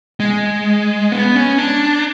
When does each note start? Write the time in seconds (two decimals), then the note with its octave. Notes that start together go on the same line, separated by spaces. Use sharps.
0.20 G#3
1.12 B3
1.35 C#4
1.58 D4